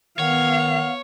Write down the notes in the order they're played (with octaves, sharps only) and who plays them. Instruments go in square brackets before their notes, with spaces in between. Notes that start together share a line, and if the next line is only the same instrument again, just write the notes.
[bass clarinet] D#3 [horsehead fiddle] B3 F5 [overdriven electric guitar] C#5 [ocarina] F#5